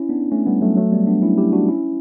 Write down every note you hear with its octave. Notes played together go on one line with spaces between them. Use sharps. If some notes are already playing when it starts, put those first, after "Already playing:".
Already playing: C#4 E4
B3 D4
A3 C#4
G3 B3
F#3 A3
F#3 A3
G3 B3
B3 D4
C#4 E4
E4 G4
D4 F#4
C#4 E4